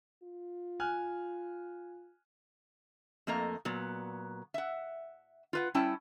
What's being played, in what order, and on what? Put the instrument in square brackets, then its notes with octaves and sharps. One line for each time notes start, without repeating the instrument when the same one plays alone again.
[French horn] F4
[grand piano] G#5 F6 F#6
[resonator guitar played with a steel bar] F2 A3 A#3 D#5 A#5
A#2 F#3 B3
E5 F#5
F4 B4 F#5
G3 C#4 E4 G5 A5